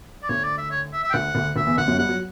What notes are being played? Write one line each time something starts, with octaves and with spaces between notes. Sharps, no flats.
D5
D2 D3 C#5
D5
E5
C#5
E5
E5
G5
D2 D3 F#5
D2 D3
D2 D3 E5
E2 E3
D2 D3 F#5
F#2 F#3
G2 G3 F#5
F#3